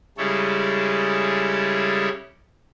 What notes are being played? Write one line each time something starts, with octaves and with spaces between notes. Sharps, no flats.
C#3 G3 G#3 E4 A4 C#5